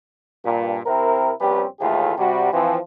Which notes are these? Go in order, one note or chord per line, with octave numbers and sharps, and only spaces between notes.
G2 A#2
C3 C4 E4 A#4
A#1 G3 C4 C#4 G4 B4
D#2 A2 E3 A3 F4 G#4
C3 G3 F#4
E3 F3 C4